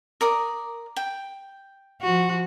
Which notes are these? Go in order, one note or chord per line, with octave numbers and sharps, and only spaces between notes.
A#4 D5 D#6
G5
F3 F#4